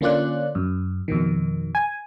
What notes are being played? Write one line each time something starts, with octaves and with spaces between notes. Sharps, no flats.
D3 A#3 C#4 F4 D5 F#6
F#2
F2 B2 D#3
G#5